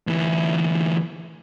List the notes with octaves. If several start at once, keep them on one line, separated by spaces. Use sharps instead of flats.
D2 E3